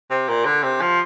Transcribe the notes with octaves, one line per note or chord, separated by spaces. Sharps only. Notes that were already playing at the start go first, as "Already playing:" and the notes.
C3
A#2
D3
C3
F3